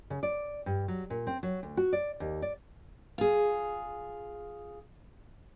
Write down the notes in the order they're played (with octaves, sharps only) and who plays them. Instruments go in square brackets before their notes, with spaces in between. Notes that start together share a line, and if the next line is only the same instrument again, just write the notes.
[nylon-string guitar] C#3
D5
G2
F#3
A#2
C4
F#3
D2
F#4
D5
D#2
D5
[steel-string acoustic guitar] F4 G#4